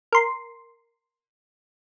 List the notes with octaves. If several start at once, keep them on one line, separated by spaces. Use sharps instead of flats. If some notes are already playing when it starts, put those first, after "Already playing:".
A#4 C6